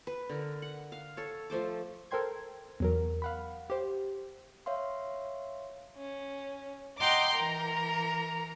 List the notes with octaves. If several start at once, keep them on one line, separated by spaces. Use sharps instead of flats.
B4
D3 A#4
F#5
F5
A4 C#5
F3 A3 C5 D6
A4 A#4 C5 G5 C6 G#6
E2 F#3 A#4
F5 F#5 B5
G4 C5
C#5 E5 F5 C6
C#4
D#5 F#5 G5 A#5 C6 D6
E3 A#4 A#5